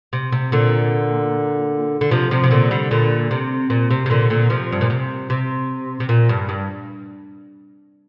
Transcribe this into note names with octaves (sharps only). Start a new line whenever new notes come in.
C3
C3
A#2 D3
D3
C3 F3
C3 F3
C3
A#2 D3
D3 G3
A#2 D3
C3
A#2
C3
C3
A#2 D3
A#2 D3
C3 F3
G2
A#2
C3
C3
C3
A#2
G2
G2